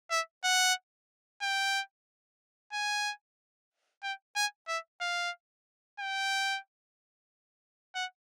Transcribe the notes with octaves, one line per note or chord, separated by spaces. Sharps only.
E5
F#5
G5
G#5
G5
G#5
E5
F5
G5
F#5